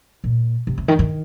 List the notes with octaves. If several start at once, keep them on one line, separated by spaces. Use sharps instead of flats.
A#2
C3
C3
D#3
D#3